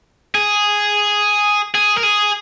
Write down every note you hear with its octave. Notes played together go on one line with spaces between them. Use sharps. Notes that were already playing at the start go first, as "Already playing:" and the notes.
G#4
G#4
A#4
G#4